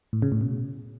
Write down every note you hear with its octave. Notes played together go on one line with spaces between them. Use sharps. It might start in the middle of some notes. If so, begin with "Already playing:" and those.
A2
C#3
A2
B2